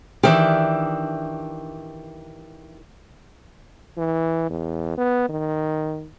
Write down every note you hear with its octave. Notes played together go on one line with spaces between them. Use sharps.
D#3 E3 D4 G4 E5
E3
E2
B3
D#3